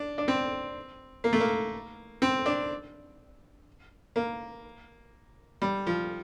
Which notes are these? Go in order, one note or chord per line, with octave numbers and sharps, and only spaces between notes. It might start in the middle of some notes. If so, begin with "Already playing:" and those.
Already playing: D4
D4
C4
A#3
A3
A#3
C4
D4
A#3
G3
F3